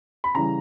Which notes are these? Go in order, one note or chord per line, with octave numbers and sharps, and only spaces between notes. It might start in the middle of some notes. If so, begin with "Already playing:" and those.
B5
C#3 E3 G3 A#5